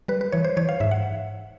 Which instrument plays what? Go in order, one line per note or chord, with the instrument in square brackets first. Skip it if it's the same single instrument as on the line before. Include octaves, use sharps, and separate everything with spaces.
[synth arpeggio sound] G3 B4
B4
E3 C#5
C5
E3 C#5
F5
G#2 E5
F#5